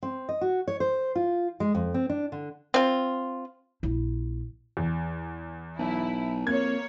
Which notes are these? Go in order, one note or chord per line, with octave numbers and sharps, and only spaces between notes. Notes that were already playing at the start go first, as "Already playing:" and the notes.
C4
D#5
F#4
C#5
C5
F4
G#3
F2
C4
D4
D3
C4 F4
A#1 E4
E2
B1 E4
F2 A#3 C#5 G#6